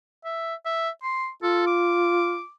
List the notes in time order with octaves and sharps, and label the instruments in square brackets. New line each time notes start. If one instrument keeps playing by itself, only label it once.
[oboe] E5
E5
C6
[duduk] F4 [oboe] A4
[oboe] D6